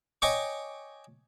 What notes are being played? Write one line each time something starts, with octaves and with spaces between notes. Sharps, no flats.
C#5 D#5 G5 G#5 C#6 D6